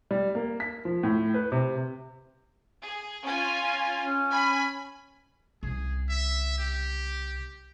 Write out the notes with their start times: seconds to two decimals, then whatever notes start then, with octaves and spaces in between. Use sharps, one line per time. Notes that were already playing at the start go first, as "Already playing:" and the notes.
0.11 G3
0.35 A#3
0.60 B6
0.85 F3
1.03 A2
1.34 B4
1.52 C3
2.82 G#4
3.25 C#4 F4 G#5
4.02 C#4
4.32 G#5 B5
5.63 C2 C#3 G#4
6.09 E5
6.58 G4